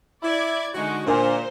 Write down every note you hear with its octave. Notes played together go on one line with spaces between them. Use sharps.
E4 D5 G#6
D3 G#3 D#4 F#4
A#2 D4 A#4 C5 G#5